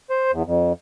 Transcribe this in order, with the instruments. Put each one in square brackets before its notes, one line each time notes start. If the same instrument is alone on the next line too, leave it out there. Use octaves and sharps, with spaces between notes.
[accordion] C5
E2
F2